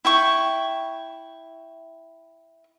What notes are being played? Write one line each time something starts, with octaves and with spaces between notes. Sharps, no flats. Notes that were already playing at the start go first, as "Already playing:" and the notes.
E4 G5 C#6